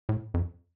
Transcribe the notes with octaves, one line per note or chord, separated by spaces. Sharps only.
A2
F2